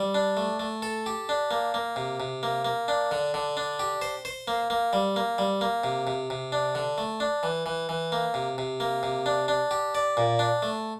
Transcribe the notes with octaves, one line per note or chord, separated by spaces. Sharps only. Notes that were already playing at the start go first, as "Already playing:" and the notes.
Already playing: G3
D4
A3
A3
A4
G4
D4
A#3
A#3
C3
C3
A#3
A#3
D4
D3
D3
D4
G4
C5
C5
A#3
A#3
G3
A#3
G3
A#3
C3
C3
C3
D4
D3
A3
D4
E3
E3
E3
A#3
C3
C3
A#3
C3
D4
D4
G4
D5
A#2
D4
A3